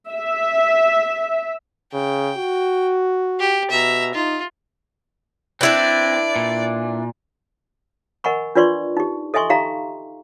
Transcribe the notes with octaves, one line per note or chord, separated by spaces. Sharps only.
E5
C#3 G5
F#4
G4
B2 E5 A#5
D#4 F4
C4 D4 E4 B4 D5
A#2
A#4 D#5 F#5 G#5 B5 C#6
D4 F4 B4 D5 C6 C#6
D#4 G4
A4 D#5 E5 G#5 C6 C#6
D#4 G4 E5 F5 A#5 B5